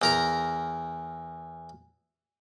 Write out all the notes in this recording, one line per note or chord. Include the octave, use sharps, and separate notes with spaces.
E2 A#4 A#5